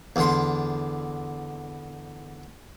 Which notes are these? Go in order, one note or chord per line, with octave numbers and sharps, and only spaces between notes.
E2 D3 C6